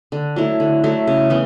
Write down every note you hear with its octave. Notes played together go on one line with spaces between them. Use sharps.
D3
F#3 A3 E4
D3
F#3 A3 E4
C#3
E3 B3